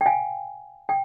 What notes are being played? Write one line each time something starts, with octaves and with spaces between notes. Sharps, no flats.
G5
F5 G#5
G5